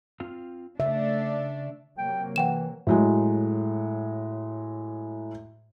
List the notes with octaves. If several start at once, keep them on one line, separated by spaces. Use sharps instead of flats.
C4 F4 F5
C#3 A3 D4 E5
C3 F#3 A#3 G5
E3 F#5 G5 E7
A2 F#3 G#3